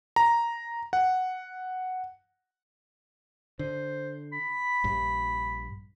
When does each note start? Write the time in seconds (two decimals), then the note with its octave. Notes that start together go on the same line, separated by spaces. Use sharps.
0.16 A#5
0.93 F#5
3.59 D3 C5
4.33 B5
4.84 A#1 G2